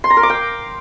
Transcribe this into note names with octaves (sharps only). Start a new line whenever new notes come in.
C6
A#5
A#4
D6
G5